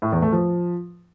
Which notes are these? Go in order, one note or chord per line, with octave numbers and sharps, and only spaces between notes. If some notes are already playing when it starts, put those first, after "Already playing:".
A2
E2
A3
F3